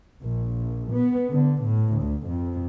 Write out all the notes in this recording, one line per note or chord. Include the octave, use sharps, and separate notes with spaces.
A#1
B3
D3
A2
D2
F2